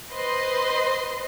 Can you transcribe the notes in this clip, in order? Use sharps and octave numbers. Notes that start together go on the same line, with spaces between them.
B4 C5 D#5 C6